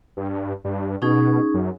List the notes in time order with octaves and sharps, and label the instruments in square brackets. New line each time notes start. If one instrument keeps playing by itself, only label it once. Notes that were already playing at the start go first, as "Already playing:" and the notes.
[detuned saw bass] G2
G2
[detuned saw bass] B2 [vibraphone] C#4 D#4 G#4
[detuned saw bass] F#2